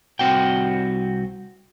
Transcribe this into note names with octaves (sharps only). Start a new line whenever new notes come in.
C2 F2 C4 F#4 G5